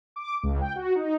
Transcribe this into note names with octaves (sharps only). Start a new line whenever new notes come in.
D6
C#2
G5
F#4
D#4